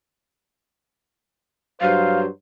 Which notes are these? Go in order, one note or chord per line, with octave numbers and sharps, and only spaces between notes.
G2 F#3 C5 F5